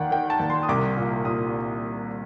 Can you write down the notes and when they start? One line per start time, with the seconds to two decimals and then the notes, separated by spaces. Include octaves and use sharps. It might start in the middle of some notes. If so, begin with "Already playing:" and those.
Already playing: D#2 D#3 D5 F#5 G5
0.11 D#3 G5
0.30 A5
0.40 D#2
0.50 C6
0.63 D#6
0.68 C2 D6
0.97 A#2
1.25 A#2 D#6